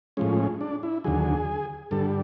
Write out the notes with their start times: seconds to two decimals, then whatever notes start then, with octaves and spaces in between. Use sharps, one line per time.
0.17 A2 F3 G#3 C#4
0.61 D4
0.83 E4
1.04 D#2 D3 F#3 G#4
1.91 G2 D3 G3 A4